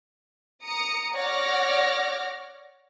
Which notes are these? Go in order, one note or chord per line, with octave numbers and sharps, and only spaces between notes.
A#5 D#6 C#7
C#5 D5 F#5 D6 F6 A#6